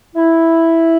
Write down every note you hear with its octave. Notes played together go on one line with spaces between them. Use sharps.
E4